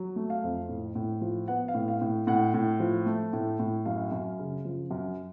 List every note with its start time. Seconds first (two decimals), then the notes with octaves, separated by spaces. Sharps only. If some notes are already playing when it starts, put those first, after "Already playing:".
Already playing: F#3
0.16 A3
0.30 F5
0.43 F2
0.69 A2
0.95 A2
1.21 F3
1.48 B3 F#5
1.68 F5
1.75 A2
1.88 F5
2.01 A2
2.27 A2 F#5
2.54 A2
2.80 F3
3.06 A3
3.33 A2
3.59 A2
3.86 F#2 F5
4.11 F#2
4.39 C#3
4.65 F3
4.91 F#2